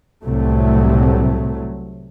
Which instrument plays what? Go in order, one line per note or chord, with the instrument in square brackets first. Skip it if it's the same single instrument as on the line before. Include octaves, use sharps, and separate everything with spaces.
[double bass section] C2 A2 C3 F#3 A3